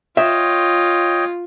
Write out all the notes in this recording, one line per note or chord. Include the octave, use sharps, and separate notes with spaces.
F4 C#5 D#5 E5 G5